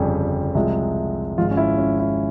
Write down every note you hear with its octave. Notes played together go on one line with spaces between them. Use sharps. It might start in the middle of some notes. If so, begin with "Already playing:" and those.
Already playing: G1 F2 C#3 G3 G#4
C2 C3 F3 G#3
G#1 G#2 F3 G#3 F4
C#4
E4
C#4
E4